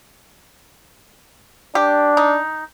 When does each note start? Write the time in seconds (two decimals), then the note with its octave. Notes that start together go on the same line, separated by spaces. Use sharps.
1.75 D4 G4
2.17 D#4